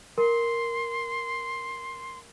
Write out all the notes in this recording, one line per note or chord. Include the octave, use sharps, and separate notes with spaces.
A#4 C6